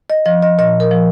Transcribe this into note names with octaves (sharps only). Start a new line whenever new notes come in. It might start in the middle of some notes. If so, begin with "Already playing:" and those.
D#5
F3 D#5
D#5
A#2 D#5
A#4
F3